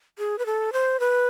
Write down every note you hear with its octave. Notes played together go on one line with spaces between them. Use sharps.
G#4
B4
A4
C5
B4